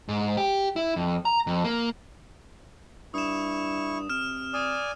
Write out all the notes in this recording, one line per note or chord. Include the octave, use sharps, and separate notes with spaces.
G#2
G4
E4
F2
A#5
F2
A#3
G2 E4 C#6 D#6 E7
C3 F6 E7
D5 G#5 D#6